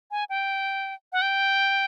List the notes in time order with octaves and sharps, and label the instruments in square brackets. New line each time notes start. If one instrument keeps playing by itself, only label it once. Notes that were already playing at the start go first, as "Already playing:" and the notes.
[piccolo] G#5
G5
F#5
G5